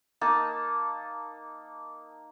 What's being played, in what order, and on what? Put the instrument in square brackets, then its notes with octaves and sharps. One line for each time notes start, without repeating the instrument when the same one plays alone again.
[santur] A#3 D#4 A5